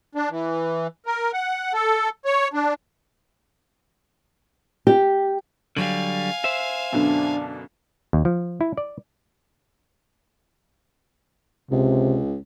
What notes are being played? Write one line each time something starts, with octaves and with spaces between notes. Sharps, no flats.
D4
E3
A#4
F#5
A4
C#5
D4
G4
D3 F#3 G3 F5 G#5 F#7
C5 E5
F#2 B2 D3 D4
D#2
F3
E4
D5
C#2 C3